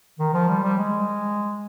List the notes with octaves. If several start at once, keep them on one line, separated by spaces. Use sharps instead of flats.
D#3
F3
G3
G3
G#3